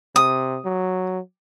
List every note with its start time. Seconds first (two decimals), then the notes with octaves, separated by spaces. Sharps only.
0.16 C3 D#6
0.65 F#3